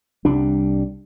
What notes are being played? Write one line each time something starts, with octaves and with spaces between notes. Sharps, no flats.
C2 G3 D4